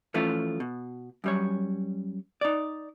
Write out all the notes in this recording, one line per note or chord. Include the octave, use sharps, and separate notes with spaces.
E3 F3 A3 C#4 F4
B2
F#2 G3 C#5
D#4 D5